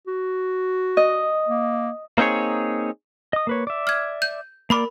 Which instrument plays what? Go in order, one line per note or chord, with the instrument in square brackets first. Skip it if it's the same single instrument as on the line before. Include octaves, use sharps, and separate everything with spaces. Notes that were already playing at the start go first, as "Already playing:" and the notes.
[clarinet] F#4
[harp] D#5
[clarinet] A#3
[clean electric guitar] A#3 C4 D#4 G#4 C#5
[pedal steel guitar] D#5 D#6
A#3 B4 C#5
D5 E5
[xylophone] F6 G#6
G6
[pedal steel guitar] A#3 D5 [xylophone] A#4 B5 D6